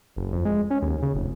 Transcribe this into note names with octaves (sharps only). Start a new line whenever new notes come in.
F#1
F2
G#3
C#4
D#2
C#3
F1